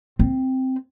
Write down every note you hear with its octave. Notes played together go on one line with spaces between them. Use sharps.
C4